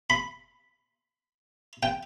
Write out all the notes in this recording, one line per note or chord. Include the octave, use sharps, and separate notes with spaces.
B5
G5